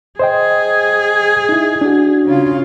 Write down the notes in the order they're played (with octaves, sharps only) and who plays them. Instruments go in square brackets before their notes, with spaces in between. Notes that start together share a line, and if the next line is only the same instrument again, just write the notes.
[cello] G#4 [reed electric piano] C5 D#5 G5
[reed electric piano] D#4 E4
D4 F#4
[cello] C#3 F4